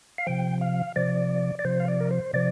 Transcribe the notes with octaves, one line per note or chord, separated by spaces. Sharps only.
F5
C3 F3 G5
F5
C3 F3 D5
D5
C3 F3 C5
F5
D5
A#4
C5
C3 F3 D5